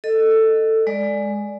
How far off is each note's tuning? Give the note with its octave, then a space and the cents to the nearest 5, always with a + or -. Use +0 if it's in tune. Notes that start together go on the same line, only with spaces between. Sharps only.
A4 +10 D#5 -15
G#3 +0 D5 +0